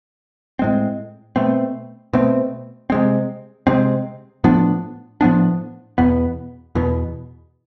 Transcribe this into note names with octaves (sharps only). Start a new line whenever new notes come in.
A2 G#3 C4
B2 A3 C4
B2 A3 C4
C3 G#3 C4
C3 G#3 C4
A2 F3 B3 D4
A2 F3 B3 D4
E2 B2 B3
E2 B2 B3